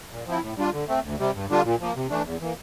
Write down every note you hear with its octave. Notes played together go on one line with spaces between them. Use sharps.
A#2
F3 C4 E4
A2
G3 D4 F4
D3
A3 C4
D2
C3 G3
G2
D3 G3 D4 F4
A#2
F3 A#3
C3
E3 A3 D4
E2
E3 A#3